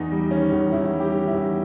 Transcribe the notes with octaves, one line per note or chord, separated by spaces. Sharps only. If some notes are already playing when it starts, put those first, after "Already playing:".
Already playing: E2 D#4
G3
D#3 C#4
E2
D#4
E2 E4
G3
G4
D#3
E4
E2